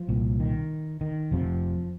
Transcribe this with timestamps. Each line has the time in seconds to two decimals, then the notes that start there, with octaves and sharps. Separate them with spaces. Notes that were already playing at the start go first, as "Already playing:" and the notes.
Already playing: F3
0.09 C2 A#2
0.40 D#3
1.01 D#3
1.31 F1 F2 C3 F3